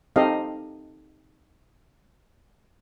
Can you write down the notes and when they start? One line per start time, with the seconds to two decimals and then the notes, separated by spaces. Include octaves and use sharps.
0.16 C4 D#4 G4 A4 D#5 F5